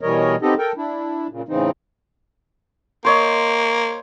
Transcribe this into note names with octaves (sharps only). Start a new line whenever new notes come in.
B2 E3 G3 A#4 C#5 D#5
B3 C4 D#4 G4 A4 D#5
A4 A#4 G5
D4 E4
A#2 C#3
A2 C#3 E3 C4 D#4
A#3 C5 C#5 D#5